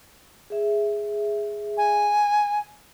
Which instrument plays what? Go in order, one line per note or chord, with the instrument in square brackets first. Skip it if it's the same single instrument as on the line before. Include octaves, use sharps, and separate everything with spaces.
[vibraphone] G#4 E5
[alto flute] G#5